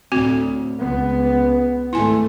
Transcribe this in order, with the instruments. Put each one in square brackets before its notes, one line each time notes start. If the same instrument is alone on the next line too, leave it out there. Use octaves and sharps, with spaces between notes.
[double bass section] D2 A2 [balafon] C4 F#4
[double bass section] C#2 B3
[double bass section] G#1 A3 [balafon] E4 G#5